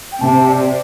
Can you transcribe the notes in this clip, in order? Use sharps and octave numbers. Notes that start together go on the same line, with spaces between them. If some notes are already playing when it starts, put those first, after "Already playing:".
G5
C3 A5
D5